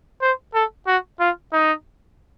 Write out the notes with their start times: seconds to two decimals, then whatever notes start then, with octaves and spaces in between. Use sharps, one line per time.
0.22 C5
0.54 A4
0.87 F#4
1.20 F4
1.52 D#4